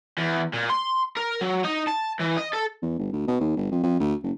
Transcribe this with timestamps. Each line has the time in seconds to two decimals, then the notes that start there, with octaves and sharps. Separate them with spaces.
0.18 E2
0.54 A#2
0.70 C6
1.17 A#4
1.41 F#3
1.64 D#4
1.87 A5
2.19 E3
2.37 D#5
2.53 A4
2.82 E2
2.99 G1
3.13 D2
3.28 B2
3.40 D#2
3.57 G1
3.72 F2
3.83 F2
4.00 D2
4.23 F#1